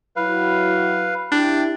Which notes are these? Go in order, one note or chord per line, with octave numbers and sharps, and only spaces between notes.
F#3 E4 F#4 B4 F5
D4 E4 G4 G5